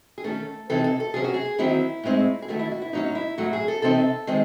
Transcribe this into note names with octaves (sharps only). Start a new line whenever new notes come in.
G#4
D#3 A3 C#4 A4
C3 E3 C4 D#4 A4
A4
A4
C3 F#3 C#4 G#4
F#4
G#4
D#3 F#3 C4 D#4 E4
A2 G#3 C4 D#4
G#4
D#3 F#3 A3 D#4 F#4
E4
F#4
E4
A2 F#3 C#4 D#4
E4
A2 F#3 A3 F#4
G#4
A4
C3 E3 C4 D#4 A4
D#3 G#3 C4 D#4